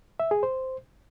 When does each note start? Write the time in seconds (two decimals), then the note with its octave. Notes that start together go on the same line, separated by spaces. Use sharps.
0.20 E5
0.31 G#4
0.43 C5